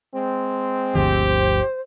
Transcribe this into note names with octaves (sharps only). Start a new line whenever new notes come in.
G#3 C4
G1 D2 F3 G4 C5